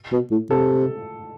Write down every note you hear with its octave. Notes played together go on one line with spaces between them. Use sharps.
B2
A2
C3 A4